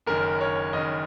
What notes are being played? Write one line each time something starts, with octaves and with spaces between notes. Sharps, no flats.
F#1 F#2 D#3 A#4
C#5
F#1 F#2 D#3 D#5